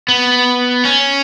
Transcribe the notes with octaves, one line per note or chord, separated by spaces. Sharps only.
B3
C#4